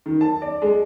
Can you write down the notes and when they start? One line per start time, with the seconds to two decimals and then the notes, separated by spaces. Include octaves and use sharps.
0.06 D#3
0.21 A5
0.42 D5
0.62 G#3